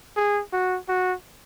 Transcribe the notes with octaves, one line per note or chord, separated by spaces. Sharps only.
G#4
F#4
F#4